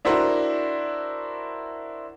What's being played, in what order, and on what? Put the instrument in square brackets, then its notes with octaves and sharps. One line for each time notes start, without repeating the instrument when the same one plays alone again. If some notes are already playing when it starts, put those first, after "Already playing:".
[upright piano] D4 E4 F#4 A#4 C5